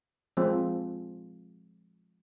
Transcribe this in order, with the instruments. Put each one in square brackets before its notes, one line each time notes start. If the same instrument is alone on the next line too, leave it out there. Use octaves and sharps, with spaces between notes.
[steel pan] F3 G#3 C4